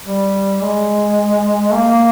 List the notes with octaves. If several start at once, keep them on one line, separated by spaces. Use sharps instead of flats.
G3
G#3
A#3